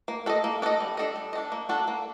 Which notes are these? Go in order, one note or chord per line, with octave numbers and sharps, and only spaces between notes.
A#3
D4 A4 D#5
A#3
D4 A4 D#5
G3
D4 A4 D#5
G3
D#5
D4 A4
A#3
D4 F#4 A4
A#3